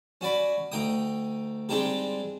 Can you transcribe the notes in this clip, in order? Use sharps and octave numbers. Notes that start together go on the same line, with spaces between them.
C#4 F#4 D5 B5
D2 D#4 G5 D#6
G3 G#3 C4 D4 D#4 G4